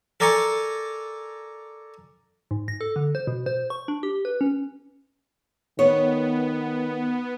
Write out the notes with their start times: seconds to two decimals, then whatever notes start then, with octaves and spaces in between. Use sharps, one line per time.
0.20 A4 A#4 D5 G#5 A#5 C#6
2.51 G#2
2.68 A#6
2.81 A4
2.96 D3
3.15 C5
3.27 B2
3.46 C5
3.70 C#6
3.88 D4
4.03 G4
4.25 B4
4.41 C#4
5.79 D#3 B3 C#5